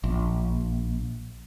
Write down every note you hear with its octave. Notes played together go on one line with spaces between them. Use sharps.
A#1